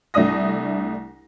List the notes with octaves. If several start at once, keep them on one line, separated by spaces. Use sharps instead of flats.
C2 A3 D4 D#6 A#6